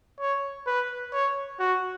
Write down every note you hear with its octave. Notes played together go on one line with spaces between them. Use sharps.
C#5
B4
C#5
F#4